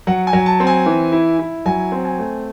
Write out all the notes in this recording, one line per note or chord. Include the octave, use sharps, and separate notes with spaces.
F#3 F#5
G#5
F#3
A5
C4
G#5
E3
E4
E4
F#3 G#5
C4
G#5
A3